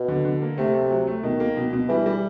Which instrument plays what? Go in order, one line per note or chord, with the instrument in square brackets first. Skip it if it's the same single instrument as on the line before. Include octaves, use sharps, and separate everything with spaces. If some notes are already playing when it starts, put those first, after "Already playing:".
Already playing: [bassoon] B2
[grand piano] D3
D3
A#3
[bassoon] C3 [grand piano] A3
[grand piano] A3
F#3
A3
[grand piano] B2 [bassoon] D#3
[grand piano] A#3
B2
B2
[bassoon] E3 [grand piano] G3
[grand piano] G3